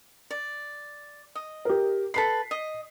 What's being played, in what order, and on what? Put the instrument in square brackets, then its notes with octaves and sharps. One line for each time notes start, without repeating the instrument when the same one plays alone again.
[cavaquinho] D5
D#5
[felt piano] G4 A#4
[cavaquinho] A4 B4 B5 [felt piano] B6 C7
[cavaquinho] D#5